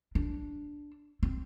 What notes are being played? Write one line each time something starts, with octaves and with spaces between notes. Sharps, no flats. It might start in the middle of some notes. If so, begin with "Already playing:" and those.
D4
C4